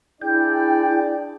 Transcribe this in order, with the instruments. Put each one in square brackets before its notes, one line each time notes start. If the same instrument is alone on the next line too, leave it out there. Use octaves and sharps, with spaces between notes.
[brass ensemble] D4 G#4 D5 [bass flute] E4 [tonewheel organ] G5